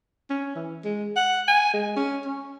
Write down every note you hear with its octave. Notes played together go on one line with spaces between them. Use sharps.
C#4
E3
G#3
F#5
G#5
G#3
C#4
C#4